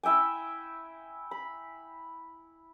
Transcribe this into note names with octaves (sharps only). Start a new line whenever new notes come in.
E4 E5 G5 G#5
B5